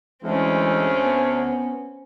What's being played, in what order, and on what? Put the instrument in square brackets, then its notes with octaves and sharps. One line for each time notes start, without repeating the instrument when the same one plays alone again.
[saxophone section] D2 [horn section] E3 G#3 [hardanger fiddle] C4 C#4
[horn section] B3